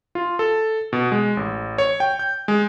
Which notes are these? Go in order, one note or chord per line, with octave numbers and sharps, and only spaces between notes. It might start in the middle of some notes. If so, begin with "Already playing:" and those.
F4
A4
B2
G#3
A1
C#5
G5
G6
G#3